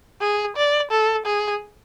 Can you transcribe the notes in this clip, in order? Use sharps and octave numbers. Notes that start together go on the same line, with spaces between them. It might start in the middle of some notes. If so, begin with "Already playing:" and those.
G#4
D5
A4
G#4